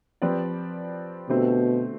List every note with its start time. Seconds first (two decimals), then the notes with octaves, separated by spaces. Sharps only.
0.22 F3 C4 G4 B4 D5
1.29 B2 D3 A3 C4 G4 C5